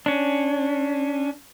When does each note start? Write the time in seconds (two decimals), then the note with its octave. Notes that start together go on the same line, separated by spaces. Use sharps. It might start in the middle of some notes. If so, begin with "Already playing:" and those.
0.06 C#4 D4